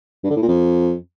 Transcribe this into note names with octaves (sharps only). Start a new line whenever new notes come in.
G2
D3
A2
A#2
F2